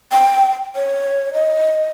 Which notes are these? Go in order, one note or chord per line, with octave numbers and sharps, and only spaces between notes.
G5
C#5
D#5